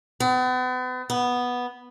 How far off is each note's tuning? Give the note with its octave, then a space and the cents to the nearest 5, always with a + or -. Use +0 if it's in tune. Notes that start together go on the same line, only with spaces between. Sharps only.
B3 +40
B3 -5